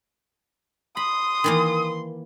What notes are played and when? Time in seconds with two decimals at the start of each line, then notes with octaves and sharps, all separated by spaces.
0.97 B5 C6 D#6
1.44 D#3 E3 A#3